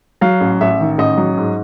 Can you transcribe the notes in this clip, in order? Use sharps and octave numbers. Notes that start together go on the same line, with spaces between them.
F#3 F5
A1
A1 E5
D#3
A1 D#5
F#3
G#2